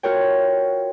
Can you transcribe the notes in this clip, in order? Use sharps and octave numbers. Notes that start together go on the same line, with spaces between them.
F4 F#4 A#4 C#5 G5